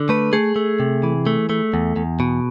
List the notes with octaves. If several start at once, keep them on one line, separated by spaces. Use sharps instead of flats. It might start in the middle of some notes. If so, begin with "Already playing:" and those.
Already playing: D3
A3 B4
A3 G#4
A3
C3
E3
A3
A3
E2
E2
B2